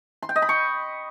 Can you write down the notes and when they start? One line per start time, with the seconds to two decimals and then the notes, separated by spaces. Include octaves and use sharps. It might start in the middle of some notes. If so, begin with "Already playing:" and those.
0.22 C6
0.29 G5
0.36 D#5
0.42 B5
0.49 C#6